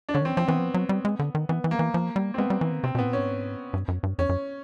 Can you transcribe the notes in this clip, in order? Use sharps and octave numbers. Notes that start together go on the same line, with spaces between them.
D4
D3 C#4
D#3
E3 C4
F3 C4
E3 B3
F3
F#3
G3
G#3
D3
D#3
E3 B3
E3
A#3
E3
F3
G3
C4
G#3 B3
G3
E3
D#3
C3 C4
B2
A2 B3
A#2
G#2 C#4
G2
F#2
G2
F2 C#4
F#2